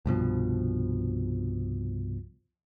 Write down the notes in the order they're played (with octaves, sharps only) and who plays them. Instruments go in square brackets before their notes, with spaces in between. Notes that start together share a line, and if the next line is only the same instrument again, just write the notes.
[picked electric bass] C2 G2 B2 F3